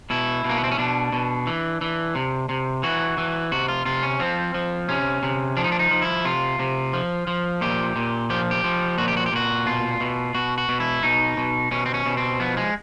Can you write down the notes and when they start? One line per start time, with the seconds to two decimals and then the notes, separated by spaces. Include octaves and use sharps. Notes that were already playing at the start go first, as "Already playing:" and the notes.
0.10 B2 E4
0.44 B2
0.49 A#3
0.57 B3
0.64 C4
0.71 C#4
0.78 B2 D4
1.12 B2
1.47 E3
1.81 E3
2.15 C3
2.49 C3
2.83 E3 F#4
3.18 E3
3.52 C3 F#4
3.68 F4
3.86 C3 F4
4.03 C#4
4.20 F3 C4
4.54 F3
4.89 C3 C#4
5.23 C3
5.57 F3 D4
5.64 D#4
5.72 D4
5.79 D#4
5.91 F3
6.02 E4
6.25 C3 F4
6.59 C3
6.93 F3
7.27 F3
7.61 A#2 G4
7.96 A#2
8.30 F3 G4
8.51 G4
8.64 F3
8.98 A#2 F#4
9.08 G4
9.17 F#4
9.26 G4
9.32 A#2 F#4
9.66 B2 F4
10.00 B2
10.35 B2 F#4
10.58 F#4
10.69 B2
10.80 E4
11.03 B2 D#4
11.37 B2
11.71 B2 C#4
11.86 C4
11.94 C#4
12.06 B2
12.17 C4
12.40 F3 B3
12.57 G#3